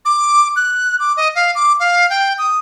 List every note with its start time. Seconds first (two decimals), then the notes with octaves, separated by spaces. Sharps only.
0.05 D6
0.56 F#6
1.00 D6
1.17 D#5
1.35 F5
1.55 D6
1.80 F5
2.10 G5
2.38 D#6